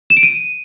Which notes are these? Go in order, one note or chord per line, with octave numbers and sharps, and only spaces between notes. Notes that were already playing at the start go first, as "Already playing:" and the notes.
E7
D7
D#7